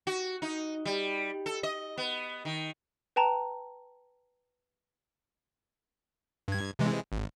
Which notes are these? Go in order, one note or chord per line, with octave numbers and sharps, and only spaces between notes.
F#4
D#4
G3
A4
D#5
B3
D#3
B4 G5 A5 A#5
G2 G#6
C3 E3 G#3
G#1